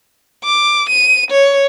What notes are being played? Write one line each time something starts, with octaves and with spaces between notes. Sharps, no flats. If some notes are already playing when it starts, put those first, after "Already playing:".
D6
D#7
C#5